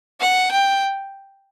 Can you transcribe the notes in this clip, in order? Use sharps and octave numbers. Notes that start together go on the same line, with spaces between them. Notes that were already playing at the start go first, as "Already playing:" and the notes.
F#5
G5